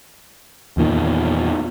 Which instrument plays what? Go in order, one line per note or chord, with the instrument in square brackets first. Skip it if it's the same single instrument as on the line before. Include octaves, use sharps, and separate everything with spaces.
[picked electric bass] E2 A#2 D#3